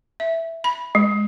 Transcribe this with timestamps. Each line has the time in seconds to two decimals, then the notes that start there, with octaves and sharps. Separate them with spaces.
0.20 E5
0.64 B5
0.95 G#3